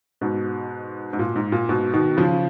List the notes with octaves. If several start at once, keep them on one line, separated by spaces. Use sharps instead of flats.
G#2 B2
G#2
A#2
G#2
A#2
G#2 B2
B2 D#3
C#3 F3